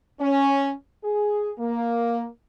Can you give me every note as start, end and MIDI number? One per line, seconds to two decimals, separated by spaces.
0.19 0.71 61
1.04 1.52 68
1.59 2.27 58